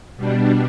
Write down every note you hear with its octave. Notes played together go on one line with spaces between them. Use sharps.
B2 G3 D4